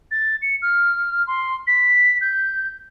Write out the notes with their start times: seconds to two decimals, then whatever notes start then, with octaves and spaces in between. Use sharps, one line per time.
0.11 A6
0.42 C#7
0.62 F6
1.27 C6
1.67 B6
2.21 G6